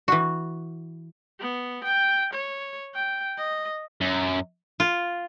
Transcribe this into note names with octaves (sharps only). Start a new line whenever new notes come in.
E3 F#4
B3
G5
C#5
G5
D#5
F#2
F4